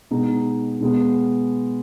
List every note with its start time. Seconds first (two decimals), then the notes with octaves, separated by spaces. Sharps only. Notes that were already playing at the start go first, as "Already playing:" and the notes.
0.11 B2 G#3 B3 D#4
0.81 B2 G#3 B3